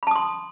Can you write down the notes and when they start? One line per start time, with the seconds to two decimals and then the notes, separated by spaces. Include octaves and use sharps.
0.03 B5
0.07 A5
0.11 D#6
0.16 C6